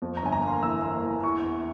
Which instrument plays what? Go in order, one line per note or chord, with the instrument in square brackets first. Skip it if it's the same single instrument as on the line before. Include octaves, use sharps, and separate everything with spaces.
[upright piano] F2
A#5
G1 G#5
A#5
A#3 C6
E3 E6
A#3
E3
E2 C#6
E2